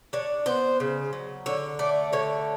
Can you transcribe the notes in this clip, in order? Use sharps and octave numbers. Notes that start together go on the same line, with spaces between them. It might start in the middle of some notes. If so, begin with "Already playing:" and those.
D4 C#5
B3 C5
C#3
F#3
D3 C#5
A3 D5
D3 C#5